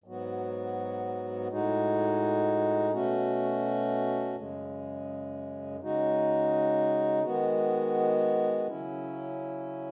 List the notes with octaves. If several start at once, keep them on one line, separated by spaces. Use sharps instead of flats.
G#2 F#3 B3 F#4
A2 G#3 D#4 F#4
B2 A3 C#4 F#4
F#2 C#3 G#3
C#3 G#3 D#4 F#4
D#3 G#3 B3 F#4
C#3 F#3 C#4 E4